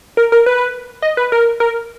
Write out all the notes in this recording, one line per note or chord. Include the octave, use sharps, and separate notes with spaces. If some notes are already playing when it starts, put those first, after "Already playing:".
A#4
A#4
B4
D#5
B4
A#4
A#4